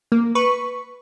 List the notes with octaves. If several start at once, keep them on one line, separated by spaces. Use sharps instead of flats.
A#3
B4 C#6